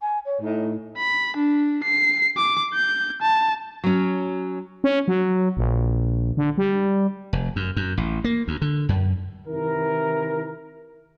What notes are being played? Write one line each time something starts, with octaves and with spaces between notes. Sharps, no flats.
G#5
C#5
A2 D#4
B5
D4
C7
D6
G6
A5
F#3 C#4
C#4
F#3
A#1
D3
G3
F1
F#2
F#2
A1
A#3
D2
D3
F#2
C3 D#3 E3 E4 A#4